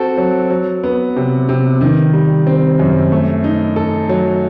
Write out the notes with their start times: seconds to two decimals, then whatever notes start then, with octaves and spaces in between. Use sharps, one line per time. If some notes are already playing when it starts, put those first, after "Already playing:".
Already playing: C4 F#4 A4
0.17 F#3
0.50 F#3
0.84 B3
1.16 C3
1.49 C3
1.81 D#3
2.13 G3
2.47 C4
2.80 F#2
3.12 A3
3.44 D#4
3.76 A4
4.09 F#3